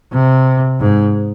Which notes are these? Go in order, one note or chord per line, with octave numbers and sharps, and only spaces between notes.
C3
G#2